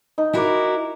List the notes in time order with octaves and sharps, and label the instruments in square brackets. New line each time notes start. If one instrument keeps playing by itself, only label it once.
[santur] D#4
[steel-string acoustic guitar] E4 F#4 A#4 [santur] A#5 D6